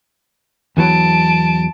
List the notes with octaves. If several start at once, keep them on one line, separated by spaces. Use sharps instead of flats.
E2 E3 F#3 A5 D7